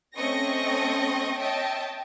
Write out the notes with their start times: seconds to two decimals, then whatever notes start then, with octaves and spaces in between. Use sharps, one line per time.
0.15 A3 C4 C#4 D#5 C#6 A#6
1.38 C#5 D#5 E5 G5 A5